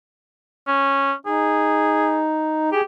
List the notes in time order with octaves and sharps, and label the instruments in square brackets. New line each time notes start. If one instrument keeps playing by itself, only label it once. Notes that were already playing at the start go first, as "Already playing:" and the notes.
[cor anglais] C#4
[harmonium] D#4 [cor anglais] G#4
[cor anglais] G4 [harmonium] G#4